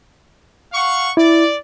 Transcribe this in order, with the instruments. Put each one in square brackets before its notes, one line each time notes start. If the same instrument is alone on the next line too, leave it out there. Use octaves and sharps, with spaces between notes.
[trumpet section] F5 F#5 C#6
[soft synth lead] E4 [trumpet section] D5